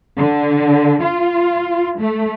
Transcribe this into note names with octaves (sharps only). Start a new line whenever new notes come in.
D3
F4
A3